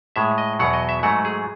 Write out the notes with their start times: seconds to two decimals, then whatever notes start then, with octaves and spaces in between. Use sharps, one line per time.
0.16 A2 G#3 E5
0.38 D#5
0.59 E2 B2 F#3 F#5
0.73 D#5
0.89 E5
1.03 G#2 F#3 A3 F#5
1.25 G#4